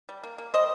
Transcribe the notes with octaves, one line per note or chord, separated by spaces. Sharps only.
G3
A#3
A#3
G3 C5 D#5